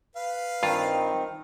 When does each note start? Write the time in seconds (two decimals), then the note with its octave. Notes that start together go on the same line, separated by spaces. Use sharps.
0.16 B4 F5
0.63 G2 D#3 C4 F4